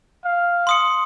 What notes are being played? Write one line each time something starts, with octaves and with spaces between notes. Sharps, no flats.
F5
C6 D#6 C#7